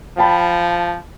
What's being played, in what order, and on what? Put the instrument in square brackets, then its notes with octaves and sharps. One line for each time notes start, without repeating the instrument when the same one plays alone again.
[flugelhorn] F3 [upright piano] G5 A5 B5